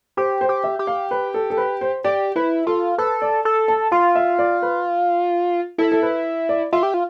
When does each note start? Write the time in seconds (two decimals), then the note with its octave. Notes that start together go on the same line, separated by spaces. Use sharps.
0.17 G4 C5
0.41 C5
0.49 G4
0.64 E5
0.79 G4
0.87 F5
1.11 B4
1.34 A4
1.50 A4
1.57 B4
1.81 C5
2.04 G4 D5
2.36 E4 B4
2.67 F4 A4
2.98 A4 B4
3.22 D5
3.45 A4
3.68 A5
3.92 F4 F5
4.15 E5
4.39 D5
4.62 B4
5.78 E4 A4
5.92 A4
6.02 B4
6.49 D5
6.73 F4 E5
6.83 G4
6.94 F4